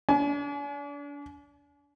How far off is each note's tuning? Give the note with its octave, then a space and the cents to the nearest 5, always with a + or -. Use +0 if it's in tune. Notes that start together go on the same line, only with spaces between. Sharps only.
D4 -35 G#5 +35